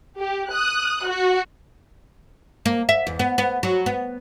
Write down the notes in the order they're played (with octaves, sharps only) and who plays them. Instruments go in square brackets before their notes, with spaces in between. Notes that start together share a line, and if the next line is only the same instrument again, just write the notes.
[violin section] G4
D#6 F#6
F#4
[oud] A#3
E5
E2
B3
B3
F#3
B3